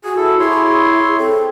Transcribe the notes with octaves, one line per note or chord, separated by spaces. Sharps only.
F#4 G#4
E4 A4
E4 G#4 C#5 C6
C4 A4